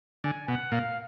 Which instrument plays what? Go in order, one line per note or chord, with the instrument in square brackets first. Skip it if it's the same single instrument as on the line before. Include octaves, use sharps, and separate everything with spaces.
[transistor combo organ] D3 [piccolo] G#5
[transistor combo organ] B2 [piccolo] F#5
[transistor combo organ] A#2 [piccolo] F5